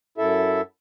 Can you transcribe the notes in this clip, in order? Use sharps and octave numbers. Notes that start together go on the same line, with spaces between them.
F#2 E4 A4 E5